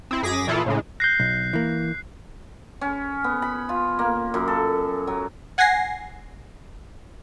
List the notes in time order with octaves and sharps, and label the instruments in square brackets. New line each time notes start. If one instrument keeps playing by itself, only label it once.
[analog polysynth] C4 E4
F#2 G#4 D6 G#6 A#6 B6
A#2 E3 E4 F4 G#4 A4
A2 C#3 G#3
[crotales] F#6 C7 [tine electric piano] G6 A#6
[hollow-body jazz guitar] B1
E3 A#3
[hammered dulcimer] C#4
B3
B5
F4
A#3
F#2
A4
F#3
[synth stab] F#5 G#5 G#6 A#6 C7